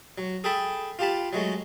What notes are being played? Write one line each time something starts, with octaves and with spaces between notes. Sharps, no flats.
F#3
G#4 A4 G5 A5 B5
F4 G4 A5 B5
F#3 G#3 A3